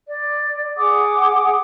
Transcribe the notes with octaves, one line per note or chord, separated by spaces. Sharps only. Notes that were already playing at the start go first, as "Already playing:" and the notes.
D5
G#4 F#5 D6 D#6